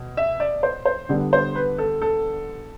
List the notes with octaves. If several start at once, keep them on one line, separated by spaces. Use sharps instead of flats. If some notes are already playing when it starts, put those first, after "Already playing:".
Already playing: B2
E5
D5
C5
C5
D3 G3 B3 D4
C5
B4
A4
A4